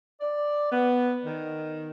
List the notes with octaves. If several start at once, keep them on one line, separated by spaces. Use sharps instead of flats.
D5
B3
D#3